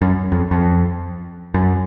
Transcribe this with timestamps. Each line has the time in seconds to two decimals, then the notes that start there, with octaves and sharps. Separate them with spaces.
0.02 F#2
0.32 F2
0.51 F2
1.54 F#2